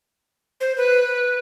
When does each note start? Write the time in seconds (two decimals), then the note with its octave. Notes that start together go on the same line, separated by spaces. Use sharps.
0.61 C5
0.77 B4